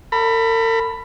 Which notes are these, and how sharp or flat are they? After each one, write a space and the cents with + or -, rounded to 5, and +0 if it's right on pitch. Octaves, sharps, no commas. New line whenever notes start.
A#4 -45 B5 +0